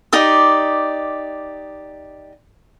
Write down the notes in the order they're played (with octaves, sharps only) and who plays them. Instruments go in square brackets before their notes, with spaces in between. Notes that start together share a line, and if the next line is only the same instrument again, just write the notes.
[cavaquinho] D#4 G4 D5 D#6